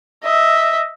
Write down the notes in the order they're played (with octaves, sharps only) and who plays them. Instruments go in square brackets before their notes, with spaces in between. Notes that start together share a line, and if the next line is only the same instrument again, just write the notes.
[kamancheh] D#5 E5